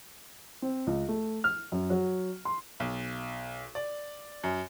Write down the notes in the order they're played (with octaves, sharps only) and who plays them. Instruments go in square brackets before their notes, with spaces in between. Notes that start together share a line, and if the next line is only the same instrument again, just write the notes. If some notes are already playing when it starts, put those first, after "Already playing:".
[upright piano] C4
C#2
A3
F6
F#2
F#3
C6
[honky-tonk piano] B1
D5
F#2